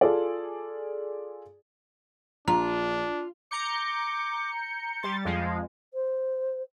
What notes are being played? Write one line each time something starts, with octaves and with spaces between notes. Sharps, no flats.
F4 G#4 A4 D5
A#1 D4 F4 A#5
A#5 D6 G6 C#7
G3 C6 A6
F2 F3 G#3 F5
C5